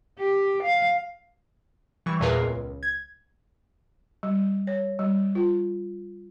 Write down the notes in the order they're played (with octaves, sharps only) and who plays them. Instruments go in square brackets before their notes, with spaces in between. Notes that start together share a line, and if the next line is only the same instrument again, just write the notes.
[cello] G4
F5
[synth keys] E3 G3 C#6
E2 A#2 G#4 A#4 B4 C7
C#2
G#6
[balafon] G3
C#5
G3
F4